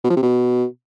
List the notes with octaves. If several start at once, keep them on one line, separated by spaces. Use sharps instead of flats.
B2
F3
C3
B2